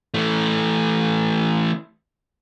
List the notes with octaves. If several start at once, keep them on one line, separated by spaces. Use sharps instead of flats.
E3 A3